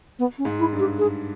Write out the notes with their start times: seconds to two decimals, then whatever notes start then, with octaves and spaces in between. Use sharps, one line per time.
0.19 B3
0.38 C#4
0.45 G#2
0.59 E4
0.73 G2
0.79 G4
0.99 G#4